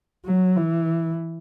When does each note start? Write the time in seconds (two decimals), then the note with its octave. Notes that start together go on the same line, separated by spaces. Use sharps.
0.25 F#3
0.56 E3